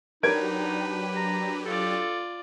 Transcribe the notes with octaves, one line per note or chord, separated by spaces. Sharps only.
F#3 D4 D#4 G4 A#4 B4 G#6 D7
A#5
F4 A4 D5